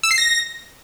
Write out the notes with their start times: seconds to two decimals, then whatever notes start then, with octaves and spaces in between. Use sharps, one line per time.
0.03 E6
0.11 C7
0.18 A#6